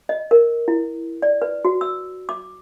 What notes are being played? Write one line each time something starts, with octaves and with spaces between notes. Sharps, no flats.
D#5
A#4
E4
D5
B4
F#4
E6
D6